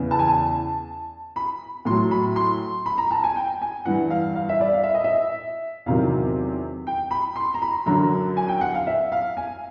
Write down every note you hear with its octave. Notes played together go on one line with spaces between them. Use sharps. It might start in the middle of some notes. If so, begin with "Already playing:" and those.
Already playing: E2 C#3 E3
A5
G#5
A5
B5
A2 F#3 C6
B5
C6
B5
A#5
A5
G#5
G5
G#5
G2 E3 F#5
F5
F5
E5
D5
F5
E5
D#5
E5
E2 C3 D#3 F#3 F5
G5
B5
C6
A#5
B5
F#2 D3 F#3 A#5
G#5
G5
F#5
F5
E5
F5
G#5